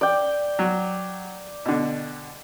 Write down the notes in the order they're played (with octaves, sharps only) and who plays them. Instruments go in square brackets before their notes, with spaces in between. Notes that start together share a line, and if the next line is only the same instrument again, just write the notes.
[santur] D5 G5
[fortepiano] F#3
B2 D3